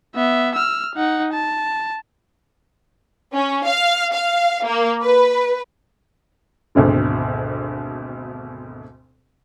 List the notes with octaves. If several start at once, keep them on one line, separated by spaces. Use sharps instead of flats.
B3 E5
E6 F6
D#4 F#5
A5
C#4
F5
F5
A#3
B4
G#1 D2 B2 D3